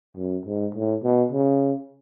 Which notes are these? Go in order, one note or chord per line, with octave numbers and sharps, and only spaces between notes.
F#2
G#2
A2
B2
C#3